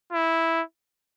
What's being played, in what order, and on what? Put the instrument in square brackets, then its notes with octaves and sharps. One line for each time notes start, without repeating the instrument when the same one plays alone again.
[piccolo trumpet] E4